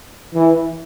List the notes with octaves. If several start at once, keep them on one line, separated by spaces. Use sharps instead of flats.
E3